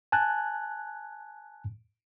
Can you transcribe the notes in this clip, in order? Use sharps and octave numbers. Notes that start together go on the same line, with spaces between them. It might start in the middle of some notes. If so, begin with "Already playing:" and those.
G#5 A5 F#6 G#6